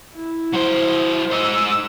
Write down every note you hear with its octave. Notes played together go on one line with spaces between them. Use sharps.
E4
F#3 C5
D#4 C5 E6